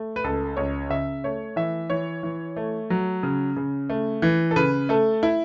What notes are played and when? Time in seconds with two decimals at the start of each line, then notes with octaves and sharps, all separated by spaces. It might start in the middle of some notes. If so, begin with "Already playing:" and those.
Already playing: A3
0.16 B4
0.24 C#2 A4
0.57 C#2 C#5
0.90 C#3 E5
1.24 A3 C#5
1.56 E3 E5
1.90 E3 C#5
2.23 E3
2.56 A3
2.90 F#3
3.23 C#3
3.57 C#3
3.89 A3
4.22 E3
4.51 A4
4.56 C#3 B4
4.89 A3 A4
5.23 E4